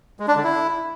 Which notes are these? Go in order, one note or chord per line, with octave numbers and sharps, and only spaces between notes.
G#3
D4
D3
E4